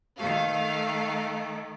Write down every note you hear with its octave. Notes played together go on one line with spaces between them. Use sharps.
D#3 A3 F5